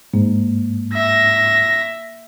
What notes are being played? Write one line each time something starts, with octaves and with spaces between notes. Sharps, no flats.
G#2 A#3
E5 A#6